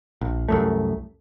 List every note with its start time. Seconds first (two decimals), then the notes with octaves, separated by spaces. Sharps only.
0.21 A#1
0.49 C2 F#2 A3